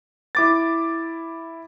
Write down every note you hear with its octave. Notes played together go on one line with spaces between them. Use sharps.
E4 D6 A6